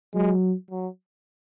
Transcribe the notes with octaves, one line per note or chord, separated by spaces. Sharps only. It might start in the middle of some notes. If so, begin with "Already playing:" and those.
F#3 G#3
F#3